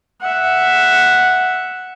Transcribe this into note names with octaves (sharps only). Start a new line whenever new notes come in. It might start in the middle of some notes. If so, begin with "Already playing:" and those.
E5 F#5